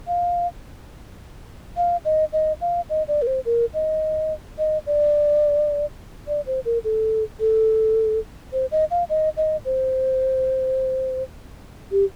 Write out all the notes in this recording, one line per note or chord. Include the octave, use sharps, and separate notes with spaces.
F5
F5
D#5
D#5
F5
D#5
D5
A#4
C5
A#4
D#5
D#5
D5
D5
C5
A#4
A4
A4
C5
D#5
F5
D#5
D#5
C5
G4